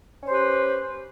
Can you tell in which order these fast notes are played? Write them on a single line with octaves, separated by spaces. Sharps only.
C#4 C5 G4 B4